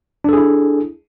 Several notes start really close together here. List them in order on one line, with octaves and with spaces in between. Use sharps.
D4 A4 G#4 E4